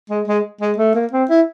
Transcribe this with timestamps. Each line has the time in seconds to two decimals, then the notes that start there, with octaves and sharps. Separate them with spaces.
0.10 G#3
0.27 G#3
0.61 G#3
0.78 A3
0.95 A#3
1.12 C4
1.29 E4